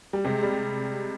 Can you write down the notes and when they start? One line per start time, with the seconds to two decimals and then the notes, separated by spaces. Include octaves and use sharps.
0.13 G3
0.25 C3 G#3
0.43 G3